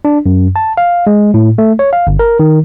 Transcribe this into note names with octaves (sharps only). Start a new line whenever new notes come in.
D4
F#2
A5
F5
G#3
A2
A3
C#5
F5
G1
A#4
D#3